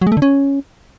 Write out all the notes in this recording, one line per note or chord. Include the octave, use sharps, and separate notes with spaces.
F#3
G#3
A3
D3
C#4